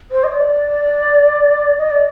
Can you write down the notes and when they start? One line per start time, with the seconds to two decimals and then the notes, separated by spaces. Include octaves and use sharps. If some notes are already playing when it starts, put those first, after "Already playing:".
0.11 C5
0.24 D#5
0.31 D5
1.78 D#5
1.90 D5